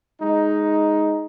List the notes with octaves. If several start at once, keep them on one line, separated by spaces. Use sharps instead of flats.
G#3 D#4